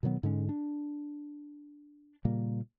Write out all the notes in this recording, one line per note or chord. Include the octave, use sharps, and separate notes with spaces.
B2 D#3 F#3 B3
G#2 D3 G#3 C#4
D4
A#2 C#3 G3 A#3